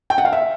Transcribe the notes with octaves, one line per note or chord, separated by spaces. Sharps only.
G5
F#5
F5
E5